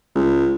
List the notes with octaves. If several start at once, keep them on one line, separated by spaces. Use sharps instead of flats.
C#2